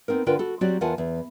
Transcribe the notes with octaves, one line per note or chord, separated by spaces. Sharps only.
B3 C4 D#4 A#4
D3 F4 A#4 B4 G5
F#4 A4
F#3 C4 F#4 G4 C#5 D5
E2 F4 A#4 F#5 G#5 A5
E2